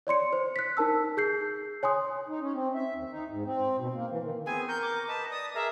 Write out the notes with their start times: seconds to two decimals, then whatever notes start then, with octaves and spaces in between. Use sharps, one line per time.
0.07 C#5 D5 C6 C#7
0.33 C5
0.56 F#6 B6
0.77 D#4 A#4 A5 E6
1.17 G#4 G6 C7
1.83 C#5 G#5 C6 D#6
2.28 D#4
2.41 C#4
2.54 C4
2.75 E5
2.94 D#2
3.10 D#4
3.30 G#2
3.46 C4
3.77 B2
3.94 A#3
4.10 E3
4.22 D#3
4.46 B3 C4 G#4 G#5
4.68 A#4 C#6 G6
4.82 D6
5.08 B4 D#5 A5
5.31 D5 D#6
5.55 G#4 A#4 E5 A#5